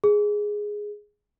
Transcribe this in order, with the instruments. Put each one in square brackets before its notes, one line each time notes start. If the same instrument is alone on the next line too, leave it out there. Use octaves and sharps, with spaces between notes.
[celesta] G#4